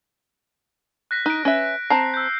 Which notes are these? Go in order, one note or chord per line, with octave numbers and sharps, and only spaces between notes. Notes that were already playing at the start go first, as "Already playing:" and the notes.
F#6 A#6 B6
D#4 F#6 D7
C#4 B4 E5
C4 A5 A#5 C7
E6 G6